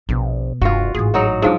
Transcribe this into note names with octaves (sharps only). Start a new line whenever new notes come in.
A#1 B2 B3
F1 G2 F4 F#4
A1 G#2 G#4
F#3 D#4 F#4
G#2 F3 F#3 C#4 D4